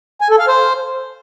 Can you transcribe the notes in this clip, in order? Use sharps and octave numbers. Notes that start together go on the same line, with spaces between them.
G#5
A4
F5
C5